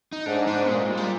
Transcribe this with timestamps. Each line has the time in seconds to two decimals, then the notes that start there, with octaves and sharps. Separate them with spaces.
0.12 D#4
0.26 G#2 D4
0.47 D4
0.69 A#2 G#3
0.91 G3
0.97 G#3
1.03 G3